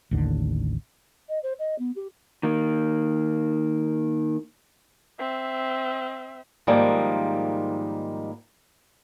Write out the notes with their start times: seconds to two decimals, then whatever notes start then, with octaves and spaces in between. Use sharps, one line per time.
0.11 A1 D#2 D3
1.29 D#5
1.43 C5
1.59 D#5
1.79 B3
1.96 G4
2.43 D#3 A#3
5.19 C4 E5
6.67 G#2 D#3 F3 G3 G#3 A#3